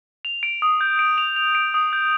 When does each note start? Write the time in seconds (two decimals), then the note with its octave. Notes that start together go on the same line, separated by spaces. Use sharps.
0.25 F7
0.43 D7
0.62 D#6
0.81 G6
0.99 D7
1.18 F7
1.36 F7
1.55 D7
1.74 D#6
1.93 G6